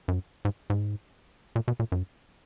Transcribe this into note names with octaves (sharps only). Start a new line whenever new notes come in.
F#2
G#2
G#2
A#2
B2
A#2
F#2